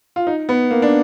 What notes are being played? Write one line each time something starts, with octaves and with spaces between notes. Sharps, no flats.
F4
D#4
B3
A#3
D4